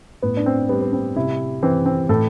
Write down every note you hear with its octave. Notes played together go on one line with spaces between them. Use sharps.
A2 B3
D4
C4
G3 B3
B3
C4
C3 E4
E3 C4
C4
A2 A4